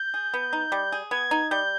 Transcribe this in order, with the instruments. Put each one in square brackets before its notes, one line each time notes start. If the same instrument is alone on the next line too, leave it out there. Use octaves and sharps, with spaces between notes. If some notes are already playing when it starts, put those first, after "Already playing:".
Already playing: [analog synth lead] G6
[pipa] G#4
B3
D#4
G3
G#4
[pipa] B3 [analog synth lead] G#6
[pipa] D#4
[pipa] G3 [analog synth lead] G6